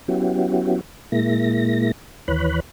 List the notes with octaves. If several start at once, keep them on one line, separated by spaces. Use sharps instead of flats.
F#3 B3 C#4 E4 F#4 G4
A#2 G#3 A#3 E4 A#6
D#2 E3 B4 C#5 B5 F#6